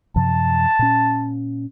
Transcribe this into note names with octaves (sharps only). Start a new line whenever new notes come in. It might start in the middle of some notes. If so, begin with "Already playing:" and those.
F#2 C3 F3 A5
A#2 C#4